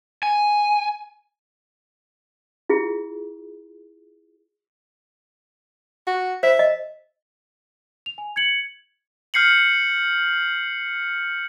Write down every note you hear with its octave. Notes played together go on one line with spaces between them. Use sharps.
G#5
E4 F4 G#4
F#4
C5 E5
D#5
F7
G#5
G#6 C#7 F#7
F6 G6 C7 C#7 F#7